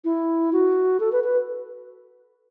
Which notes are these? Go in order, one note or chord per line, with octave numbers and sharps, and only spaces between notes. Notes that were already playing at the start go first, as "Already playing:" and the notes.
E4
F#4
A4
B4
B4